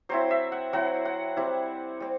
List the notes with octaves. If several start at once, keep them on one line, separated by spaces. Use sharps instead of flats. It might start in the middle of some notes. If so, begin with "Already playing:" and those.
F#3 C4 E4 C5
E5
F#5
F#3 C4 E4 F#5
F#5
G3 C4 E4
G3 C4